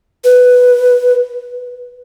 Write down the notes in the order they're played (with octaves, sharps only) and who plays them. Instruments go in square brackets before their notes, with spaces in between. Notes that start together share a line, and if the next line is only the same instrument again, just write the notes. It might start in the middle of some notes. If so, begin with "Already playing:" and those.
[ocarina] B4